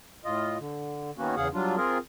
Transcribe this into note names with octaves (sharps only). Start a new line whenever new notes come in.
A2 F4 D#5
D3
D#3 A#3 B3 C#4 F#4
E2 C#3 G#4 F5 F#5
F#3 G3 D4 F4
C4 F4 G#4 A#4